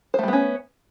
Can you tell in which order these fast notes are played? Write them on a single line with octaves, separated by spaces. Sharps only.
C5 A3 G3 B3 C#4